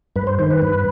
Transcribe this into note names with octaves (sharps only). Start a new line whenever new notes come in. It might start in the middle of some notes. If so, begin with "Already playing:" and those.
G2 B4
C5
D#3 C5
B4
G2